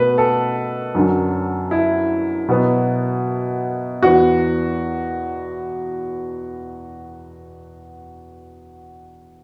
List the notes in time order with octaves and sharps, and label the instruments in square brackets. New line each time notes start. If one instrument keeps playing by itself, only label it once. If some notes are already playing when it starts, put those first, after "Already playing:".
Already playing: [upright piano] B2 A3 B4
A4
F#2 D3 F#3
E4
B2 F#3 B3
E2 E3 B3 F#4